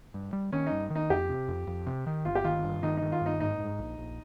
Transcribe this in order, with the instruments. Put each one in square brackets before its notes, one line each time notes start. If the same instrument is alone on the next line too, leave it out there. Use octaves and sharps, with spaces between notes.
[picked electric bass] G2
G3
[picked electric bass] D#3 [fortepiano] C#4
[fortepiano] D#4
[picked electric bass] G2
D#3
[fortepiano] D#4
[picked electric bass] F2 [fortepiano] G4
[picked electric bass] C3
F2
F2
C3
D#3
[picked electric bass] G1 [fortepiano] F4
[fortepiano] G4
[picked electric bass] D#3 [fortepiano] F4
[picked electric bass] G2
[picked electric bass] D#3 [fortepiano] D#4
[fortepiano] D#4
[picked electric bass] D#3
[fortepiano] F4
[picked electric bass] G2 [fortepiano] D#4
[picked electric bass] G#2 [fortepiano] D#4
[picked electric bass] G#2
A#1
A#1